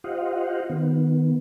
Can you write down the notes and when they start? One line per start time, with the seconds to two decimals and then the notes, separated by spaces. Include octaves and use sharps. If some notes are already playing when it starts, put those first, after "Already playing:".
0.04 F4 G4 C5 D#5 F5 F#5
0.70 D#3 B3